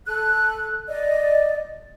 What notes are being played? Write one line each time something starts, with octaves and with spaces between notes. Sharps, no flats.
A4 F#6
D5 D#5